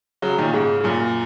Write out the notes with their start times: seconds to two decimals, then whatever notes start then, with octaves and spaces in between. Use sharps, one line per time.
0.22 C#3 F#3
0.38 A#2 D#3
0.53 G#2 C#3
0.80 C#3
0.84 F#2 A#2